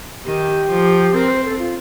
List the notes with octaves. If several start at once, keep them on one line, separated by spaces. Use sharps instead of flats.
D#3 G4
F3
C4 A#4
C5
A4
F4